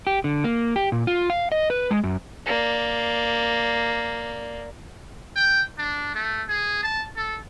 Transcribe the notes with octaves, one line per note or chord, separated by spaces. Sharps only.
G4
D3
A#3
G4
A#2
F4
F5
D#5
B4
G#3
F#2
A#3 D5
G5
D4
A3
G#4
A5
A4